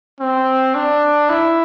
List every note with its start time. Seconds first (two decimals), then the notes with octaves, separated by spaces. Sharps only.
0.20 C4
0.75 D4
1.29 E4